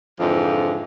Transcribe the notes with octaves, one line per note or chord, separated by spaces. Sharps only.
F2 G#2 D3 E3 F3